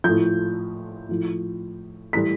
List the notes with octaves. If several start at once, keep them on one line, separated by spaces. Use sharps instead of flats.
A2 F3 G6
A2 F3
A2 E3 G3 B6